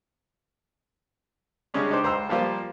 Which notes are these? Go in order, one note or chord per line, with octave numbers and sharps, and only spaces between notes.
C#3 G3 G#3 C#4 D4
D4 D#4 G4 C5
C#2 C5 A#5 E6
F3 G3 A#3 F4 C5